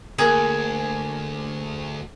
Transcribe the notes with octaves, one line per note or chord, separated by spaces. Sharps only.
D2 A#3 G#4 G#5